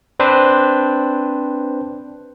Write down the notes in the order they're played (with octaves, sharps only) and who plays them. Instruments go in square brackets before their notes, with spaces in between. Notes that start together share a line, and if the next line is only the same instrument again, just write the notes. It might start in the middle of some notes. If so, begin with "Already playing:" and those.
[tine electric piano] C4 D4 B4 C5